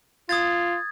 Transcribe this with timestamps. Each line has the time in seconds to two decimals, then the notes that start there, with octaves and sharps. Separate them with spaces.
0.29 F4 D#6 G#6 A6